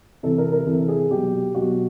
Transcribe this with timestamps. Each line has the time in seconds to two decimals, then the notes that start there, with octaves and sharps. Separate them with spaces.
0.23 C3 E3 A4
0.38 A#4
0.52 A#4
0.67 C3 E3 A4
0.89 G#4
1.10 B2 F#3 G4
1.54 B2 F#3 F#4